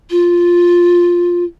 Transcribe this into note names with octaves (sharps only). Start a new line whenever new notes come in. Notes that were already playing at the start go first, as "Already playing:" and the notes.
F4